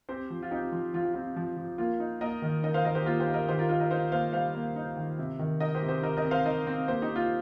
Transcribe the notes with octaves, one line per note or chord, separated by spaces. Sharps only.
C4 G4 C5
F3
F4
C4 D#4 G4
F3
F3 F4
G4
C4 F4
F3
F3
A#3 F4
D#4
A#3 A#4 D#5
D#3
D#4 A#4 D#5
C5 F5
D#3 A#4 D#5
G4 C5
A#3 F4 A#4
G4 C5
D#4
A#4 D#5
D#3 G4 C5
F4 A#4
D#4 F4 A#4
A#4 D#5
D#4 C5 F5
A#3 C5 F5
G3 C5 F5
A#3
D#4
D#3
C3
D#3
D#4 A#4 D#5
G4 C5
C3
G4 C5
D#4 A#4 D#5
A#4 D#5
C4
C5 F5
D#4 A#4 D#5
C4
A#3 G4 C5
D#4 G4
A#3
F4